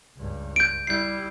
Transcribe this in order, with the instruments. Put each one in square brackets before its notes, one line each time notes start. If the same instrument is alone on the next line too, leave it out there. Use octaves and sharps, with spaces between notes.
[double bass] C#2 G2
[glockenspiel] G6 D7
[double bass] G3 E4 [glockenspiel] G6 C7